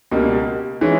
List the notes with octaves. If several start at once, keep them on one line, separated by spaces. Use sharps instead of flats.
C#2 B2 G3 A#3
E3 G#3 C#4